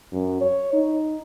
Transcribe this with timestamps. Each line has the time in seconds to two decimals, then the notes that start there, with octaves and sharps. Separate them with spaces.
0.12 F#2
0.41 C#5
0.73 D#4